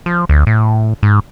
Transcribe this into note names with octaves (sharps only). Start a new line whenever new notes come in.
F3
D2
A2
G#2